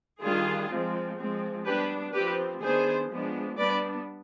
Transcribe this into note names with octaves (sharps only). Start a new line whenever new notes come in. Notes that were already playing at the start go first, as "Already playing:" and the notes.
D#3 G3 D4 F4 G#4
F3 G#3 C4
F3 G#3 C4
G3 B3 D4 G4 B4
F3 C4 G4 B4
D#3 B3 D4 G#4 C5
F3 G#3 B3 D4
G3 B3 D4 B4 D5